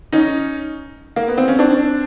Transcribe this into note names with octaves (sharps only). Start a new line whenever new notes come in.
C#4 D#4
A#3
B3
C4
C#4
C4 D4